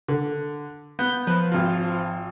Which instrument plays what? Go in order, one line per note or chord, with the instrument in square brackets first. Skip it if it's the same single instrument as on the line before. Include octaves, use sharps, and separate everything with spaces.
[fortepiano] D3
[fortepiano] B3 [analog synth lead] G6
[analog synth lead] F3 [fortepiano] B4
[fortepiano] G#1 F4